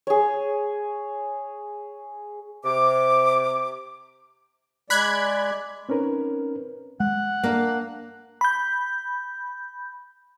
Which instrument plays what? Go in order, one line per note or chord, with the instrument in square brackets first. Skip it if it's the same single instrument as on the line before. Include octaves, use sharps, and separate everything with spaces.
[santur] G#4 C#5
[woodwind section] C3 D6
[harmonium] G#3 D5 [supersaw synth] B5 F#6 G#6
[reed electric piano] C4 C#4 D#4 A#4 B4
[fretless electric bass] G#3 [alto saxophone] F#5
[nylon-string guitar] A#3 D4
[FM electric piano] B5 G6